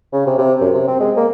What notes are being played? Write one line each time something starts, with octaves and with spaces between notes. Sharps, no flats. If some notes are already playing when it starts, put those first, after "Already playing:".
C#3
C3
C3
F#2
C3
C4
G#3
A#3